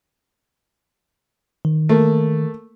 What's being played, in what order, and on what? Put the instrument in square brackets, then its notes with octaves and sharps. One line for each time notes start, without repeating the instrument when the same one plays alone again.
[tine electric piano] D#3
[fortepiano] A3 A#3